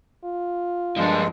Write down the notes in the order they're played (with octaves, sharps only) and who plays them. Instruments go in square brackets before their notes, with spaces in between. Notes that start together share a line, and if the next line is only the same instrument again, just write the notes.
[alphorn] F4
[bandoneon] G2 G#3 [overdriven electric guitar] F3 D4